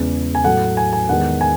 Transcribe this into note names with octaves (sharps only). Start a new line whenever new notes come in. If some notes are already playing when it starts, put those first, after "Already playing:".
Already playing: E2 C#3 G#3
G#5
A2 F#3 A3 F#5
G#5
G#5
E2 D#3 G#3 F#5
G#5